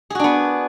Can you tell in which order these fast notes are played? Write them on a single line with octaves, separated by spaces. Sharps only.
G#4 F#4 D4 B3